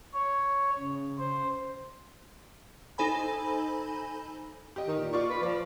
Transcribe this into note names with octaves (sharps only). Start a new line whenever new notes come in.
C#5
C#3
C5
D#4 A4 C5 G#5 B5
G4 D#5
D#3
A#2
F4 D5 C#6
B4
F3 D5